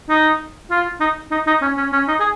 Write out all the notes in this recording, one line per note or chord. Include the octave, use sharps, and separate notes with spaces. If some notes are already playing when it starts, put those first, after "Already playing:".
D#4
F4
D#4
D#4
D#4
C#4
C#4
C#4
D#4
G#4